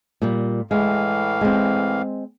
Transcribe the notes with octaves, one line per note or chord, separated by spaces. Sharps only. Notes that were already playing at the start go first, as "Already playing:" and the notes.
A#2 G3
A2 E3 G#3 F5
G#3 C4